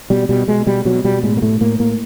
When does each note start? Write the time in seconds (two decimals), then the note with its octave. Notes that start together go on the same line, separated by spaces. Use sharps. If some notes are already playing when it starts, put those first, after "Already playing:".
0.10 B2 G3
0.29 B2 G3
0.47 B2 G#3
0.67 B2 G3
0.85 B2 F#3
1.04 B2 G3
1.23 A2 G#3
1.37 A#3
1.42 A2 A3
1.61 A2 A#3
1.80 A2 A#3